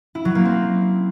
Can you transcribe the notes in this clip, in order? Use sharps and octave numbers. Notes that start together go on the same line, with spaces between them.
E4
F#3
A#3
C4